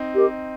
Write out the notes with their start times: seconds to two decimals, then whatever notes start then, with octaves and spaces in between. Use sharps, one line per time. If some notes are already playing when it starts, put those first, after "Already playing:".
Already playing: C4 D#4
0.13 G4 A#4 D#5